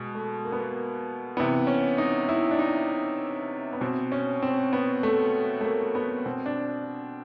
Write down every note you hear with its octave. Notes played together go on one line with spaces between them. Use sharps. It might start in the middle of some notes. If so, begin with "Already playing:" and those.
Already playing: B2 G#3
A3
A#3
B3
A#3
C3 E3 B3
C#4
D#4
E4
D4
D#4
B3
B2 C4
C#4
C4
B3
A3
A3
A#3
B3
B2 C4
D4